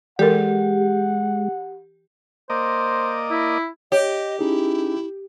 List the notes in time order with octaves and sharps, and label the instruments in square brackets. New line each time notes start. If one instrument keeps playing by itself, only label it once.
[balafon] E3 A4 A#4 [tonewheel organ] G#3 [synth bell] G4 [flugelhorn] F#5
[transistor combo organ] A#3 D5 D#5 [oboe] C5
[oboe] E4
[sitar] G4 [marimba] C#5 [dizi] D#5
[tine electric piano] C#4 D#4 G#4 [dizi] E4